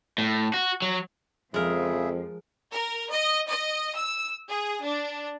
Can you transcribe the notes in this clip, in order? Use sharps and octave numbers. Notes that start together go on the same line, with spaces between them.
A2
F#4
F#3
F2 C#3 F3 G#3 G#4 A#4 E5
A#4
D#5
D#5
E6
G#4
D4